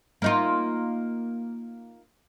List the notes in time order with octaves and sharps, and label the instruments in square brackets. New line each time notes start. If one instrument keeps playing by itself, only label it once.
[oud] A#3 D#4 F4